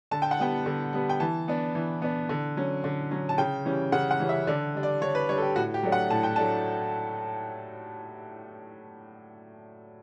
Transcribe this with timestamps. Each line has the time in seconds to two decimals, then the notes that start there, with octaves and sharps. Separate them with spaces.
0.11 D3 A5
0.22 G5
0.31 F#5
0.39 G3 B3 G5
0.66 D3
0.93 G3 B3
1.09 G5
1.20 E3 A5
1.48 B3 D4
1.75 E3
2.02 B3 D4
2.29 D3
2.56 F#3 C#4
2.84 D3
3.11 F#3 C#4
3.29 A5
3.38 C#3 G5
3.65 E3 G3 C#4
3.92 C#3 F#5
4.11 F#5
4.19 E3 G3 C#4
4.29 E5
4.47 D3 D5
4.74 G3 D4
4.83 D5
5.01 D3 C#5
5.15 B4
5.29 G3 D4 C#5
5.38 A4
5.42 G4
5.56 A2 F#4
5.74 G4
5.83 F#3 A3 D4
5.92 F#5
6.10 A2 A5
6.23 G5
6.36 F#3 A3 D4 A5